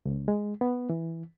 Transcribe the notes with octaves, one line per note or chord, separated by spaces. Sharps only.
C#2
G#3
B3
E3